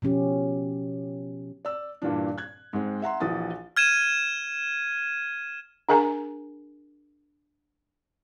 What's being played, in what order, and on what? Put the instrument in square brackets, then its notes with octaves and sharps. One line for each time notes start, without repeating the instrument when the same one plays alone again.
[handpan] B2 F3 C#4 G4
[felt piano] D5 E6
G2 A#2 E3 D4
F#6 G#6
G#2 G#3 C4
E5 F#5 A#5 C6
A#1 E3 F#4 D#6 A6
[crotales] F6 G#6 D#7 E7
[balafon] D4 G#4 A#4 G#5 A#5